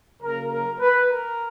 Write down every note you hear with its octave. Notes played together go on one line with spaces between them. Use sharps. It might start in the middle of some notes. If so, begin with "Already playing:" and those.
C#3 F#3 A#3 A#4
A#4
B4
A#4